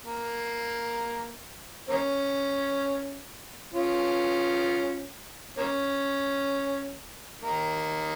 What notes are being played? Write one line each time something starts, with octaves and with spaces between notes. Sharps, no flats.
A#3
A#3 C#4
C#4 F4
A#3 C#4
A#3 D#4